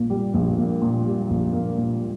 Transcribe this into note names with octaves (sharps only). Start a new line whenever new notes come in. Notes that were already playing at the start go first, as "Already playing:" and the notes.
Already playing: A#1 A#2 A#3
G3
A#1
A#3
A#2
G3
A#1
A#3
A#2